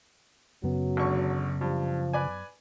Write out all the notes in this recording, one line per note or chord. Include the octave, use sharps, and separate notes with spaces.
F#2 C#3 F#3 B3
G#1 D3 C#6
G2 F3
B4 D5 G#5